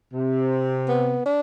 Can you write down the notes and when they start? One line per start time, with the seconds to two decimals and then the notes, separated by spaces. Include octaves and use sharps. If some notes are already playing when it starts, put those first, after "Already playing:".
0.13 C3
0.88 B3
1.26 D4